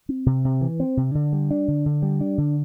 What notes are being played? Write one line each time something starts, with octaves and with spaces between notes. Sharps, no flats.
C4
C3
C3
E3
C4
C3
D3
G3
D4
D3
D3
G3
D4
D3